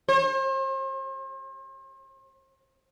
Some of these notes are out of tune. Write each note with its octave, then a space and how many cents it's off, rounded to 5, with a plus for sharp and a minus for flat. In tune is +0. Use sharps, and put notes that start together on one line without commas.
C5 +40